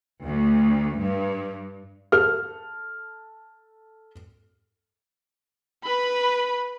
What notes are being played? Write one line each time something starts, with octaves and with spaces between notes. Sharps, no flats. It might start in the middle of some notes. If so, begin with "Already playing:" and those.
D2
G2
A4 F6
B4 B5